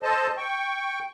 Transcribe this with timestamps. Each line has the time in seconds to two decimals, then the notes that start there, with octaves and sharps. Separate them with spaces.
0.03 A4 C5 D#5 A5
0.37 G5 C#6